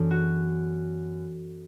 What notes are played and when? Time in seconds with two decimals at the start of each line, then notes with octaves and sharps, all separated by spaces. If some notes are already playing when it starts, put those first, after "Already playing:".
Already playing: F#2 E3 B3 D4 A4
0.11 F#4